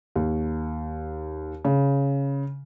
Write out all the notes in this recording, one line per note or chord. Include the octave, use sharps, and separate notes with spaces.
D#2
C#3